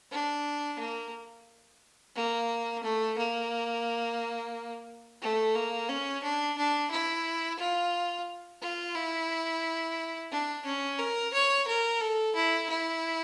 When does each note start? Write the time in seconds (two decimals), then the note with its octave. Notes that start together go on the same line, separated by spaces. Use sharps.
0.12 D4
0.79 A#3
2.16 A#3
2.83 A3
3.17 A#3
5.22 A3
5.55 A#3
5.89 C#4
6.23 D4
6.58 D4
6.91 E4
7.59 F4
8.61 F4
8.95 E4
10.31 D4
10.65 C#4
10.99 A#4
11.33 C#5
11.67 A#4
12.01 A4
12.35 E4
12.69 E4